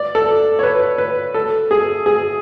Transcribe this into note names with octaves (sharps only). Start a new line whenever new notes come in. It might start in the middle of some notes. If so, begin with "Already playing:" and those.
Already playing: D5
A4
C#5
B4
B4
A4
G#4
G#4